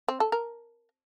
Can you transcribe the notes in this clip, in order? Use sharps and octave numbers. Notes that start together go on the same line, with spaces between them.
C4
A4
A#4